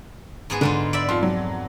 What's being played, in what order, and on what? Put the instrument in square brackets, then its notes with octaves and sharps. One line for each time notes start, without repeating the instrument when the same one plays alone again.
[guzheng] G#2 B3 G#4
[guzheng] G#2 D#4 F4 [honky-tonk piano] D3
[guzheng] D5 E5 B5
[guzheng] F2 [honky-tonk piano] F4 C6
[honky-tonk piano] F#3